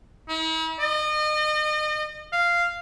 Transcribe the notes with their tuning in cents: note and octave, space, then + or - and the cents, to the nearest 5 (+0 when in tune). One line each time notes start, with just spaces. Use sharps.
E4 -45
D#5 -35
F5 -10